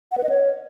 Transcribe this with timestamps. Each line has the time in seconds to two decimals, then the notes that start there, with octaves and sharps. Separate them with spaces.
0.12 F#5
0.18 B4
0.23 D#5
0.29 C#5